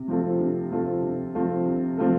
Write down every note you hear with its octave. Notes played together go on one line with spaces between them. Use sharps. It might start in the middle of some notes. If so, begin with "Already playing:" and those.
Already playing: C3
F3 C4 F4 A4
C3
F3 C4 F4 A4
C3
F3 C4 F4 A4
C3
F3 C4 F4 A4